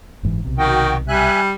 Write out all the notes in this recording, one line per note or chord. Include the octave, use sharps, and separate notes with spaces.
F#1 G#2 E3
B1 C3
D#3 F#4 G5
G3 E5 G#5 F#6